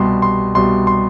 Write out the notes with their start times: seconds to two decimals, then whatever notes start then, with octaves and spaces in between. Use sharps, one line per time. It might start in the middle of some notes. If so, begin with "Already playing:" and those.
Already playing: C2 B2 G3 C6
0.22 C6
0.55 C2 B2 G3 C6
0.87 C6